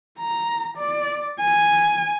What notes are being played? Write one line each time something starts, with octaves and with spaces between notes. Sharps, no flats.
A#5
D5
G#5